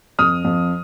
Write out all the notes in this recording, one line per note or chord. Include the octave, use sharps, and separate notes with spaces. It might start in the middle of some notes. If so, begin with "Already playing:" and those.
F2 D#6 F6
F2